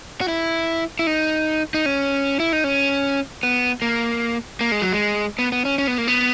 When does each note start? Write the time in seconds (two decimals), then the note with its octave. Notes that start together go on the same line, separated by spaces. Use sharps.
0.21 F#4
0.28 E4
0.99 E4
1.07 D#4
1.74 D#4
1.86 C#4
2.40 E4
2.53 D#4
2.64 C#4
3.43 B3
3.82 A#3
4.61 A#3
4.72 G#3
4.82 F#3
4.92 G#3
5.39 B3
5.52 B3
5.65 C#4
5.78 C#4
5.87 B3
5.98 A#3
6.08 B3